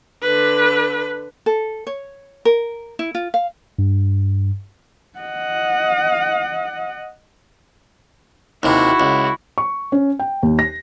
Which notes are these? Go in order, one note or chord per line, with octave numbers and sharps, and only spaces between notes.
D3 B4
A4
C#5
A#4
E4
F4
F5
G2
D#5 F#5
D#2 C3 E4 F#4
C#2
C#6
C#4
G5
D#2
A#6